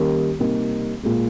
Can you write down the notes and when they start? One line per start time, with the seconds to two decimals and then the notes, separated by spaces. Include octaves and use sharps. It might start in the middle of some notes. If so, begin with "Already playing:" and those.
Already playing: D#3 G3 A#3 C#4 G4
0.39 C3 G3 A#3 D#4
1.03 A#2 G#3